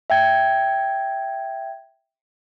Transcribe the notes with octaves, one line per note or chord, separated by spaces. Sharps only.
E5 G5 G#6